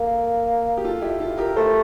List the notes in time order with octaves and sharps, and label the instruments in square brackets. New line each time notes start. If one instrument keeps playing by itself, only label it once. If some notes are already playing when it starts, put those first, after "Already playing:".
Already playing: [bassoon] A#3 [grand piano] A4
[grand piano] G4
F4 A4
E4 G4
F4 A4
G4 A#4
[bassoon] A3 [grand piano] A4 C5